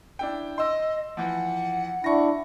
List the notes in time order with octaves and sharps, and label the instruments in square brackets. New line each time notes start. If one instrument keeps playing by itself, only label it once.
[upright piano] D4 E4 G5
[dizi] D#5 [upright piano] C6 E6
[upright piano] E3 F3 [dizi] F#5
[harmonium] D4 E4 [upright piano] C#6 A#6